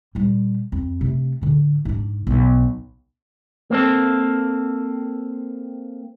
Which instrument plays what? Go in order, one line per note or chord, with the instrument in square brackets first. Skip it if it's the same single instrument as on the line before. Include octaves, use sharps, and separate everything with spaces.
[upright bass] A#2 G3
F2
C3 A3
A2 D3
G#2 D4
B1
[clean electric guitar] A#3 C4 A4